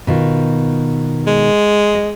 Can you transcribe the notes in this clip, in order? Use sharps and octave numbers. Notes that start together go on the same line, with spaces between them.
B2 D#3 F4
G#3
D#5